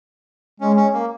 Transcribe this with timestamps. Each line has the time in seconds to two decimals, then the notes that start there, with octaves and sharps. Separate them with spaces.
0.60 G#3 C#4
0.77 C#4
0.94 A#3